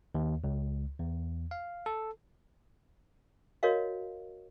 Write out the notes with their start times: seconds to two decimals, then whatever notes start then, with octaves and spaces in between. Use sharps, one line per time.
0.15 D#2
0.44 C#2
0.99 E2
1.51 F5
1.86 A4
3.63 F#4 A#4 C#5 D#5 F5